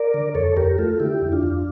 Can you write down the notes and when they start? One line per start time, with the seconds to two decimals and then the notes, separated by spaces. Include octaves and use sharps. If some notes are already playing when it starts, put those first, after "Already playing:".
Already playing: A#4 D5
0.14 D3
0.35 F2 A4 C#5
0.57 F2 G4 A#4
0.78 A3 F4 A4
1.00 D3 E4 G4
1.21 F2
1.32 D4 F4
1.43 F2